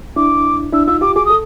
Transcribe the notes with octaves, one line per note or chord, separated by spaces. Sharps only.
D4 E4 D6
D4 E4 E6
D#4 F4 E6
F4 G4 D6
F#4 G#4 D6
A4 D#6